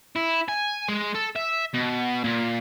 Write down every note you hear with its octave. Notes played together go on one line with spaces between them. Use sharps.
E4
G#5
G#3
A4
E5
B2
A#2